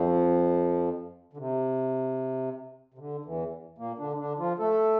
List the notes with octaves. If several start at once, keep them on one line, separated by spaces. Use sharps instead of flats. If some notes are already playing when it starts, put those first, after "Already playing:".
Already playing: F2 F3
D3
C3
C3
D3
E2 E3
A#2 A#3
D3 D4
D3 D4
F3 F4
A3 A4